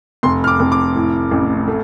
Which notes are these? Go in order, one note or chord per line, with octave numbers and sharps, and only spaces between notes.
F1 C6
F6
D6
F1
D6
A2
A1
A3